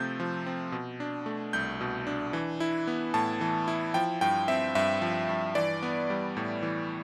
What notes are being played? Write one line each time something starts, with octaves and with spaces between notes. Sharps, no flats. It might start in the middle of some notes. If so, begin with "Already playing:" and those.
Already playing: C3 F3 A3 C4 G6
F3
C4
B2
D4
A3
C2 G6
B2
D4
E3
E4
B3
A2 A5
E3
E4
F3 G5
G2 G5
C4 E5
G2 E5
F3
G2
E3 D5
B3
G3
A2
E3